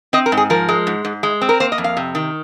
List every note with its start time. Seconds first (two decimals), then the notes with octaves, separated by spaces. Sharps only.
0.13 C4 D#5
0.26 A#4
0.32 G#2
0.37 G#4
0.50 F3 A#4
0.69 G#3
0.87 G#2
1.05 G#2
1.23 G#3
1.41 C4
1.49 A#4
1.60 A#3 C5
1.72 D#5
1.78 F2
1.84 F5
1.97 C3
2.15 D#3